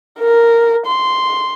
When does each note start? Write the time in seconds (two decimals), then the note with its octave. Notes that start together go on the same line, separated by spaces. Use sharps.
0.19 A#4
0.86 C6